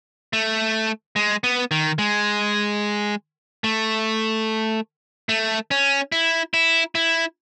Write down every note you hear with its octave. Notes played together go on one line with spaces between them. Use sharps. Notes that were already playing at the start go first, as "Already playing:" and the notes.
A3
G#3
B3
D#3
G#3
A3
A3
C#4
E4
E4
E4